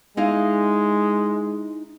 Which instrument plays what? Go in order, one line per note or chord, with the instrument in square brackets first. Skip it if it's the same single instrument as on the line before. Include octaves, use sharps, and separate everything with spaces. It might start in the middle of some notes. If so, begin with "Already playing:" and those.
[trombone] G#3 [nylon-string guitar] D#4 E4 F5